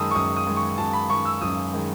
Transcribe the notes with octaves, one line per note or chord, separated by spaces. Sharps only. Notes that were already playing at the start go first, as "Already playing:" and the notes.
Already playing: F#2 D#3 G#3 A5 B5 D#6 E6
C#6
F#2 D#6
D#6
D#3 G#3
C#6
F#2 A5
B5
D#3 G#3 C#6
E6
F#2 D#6
D#3 G#3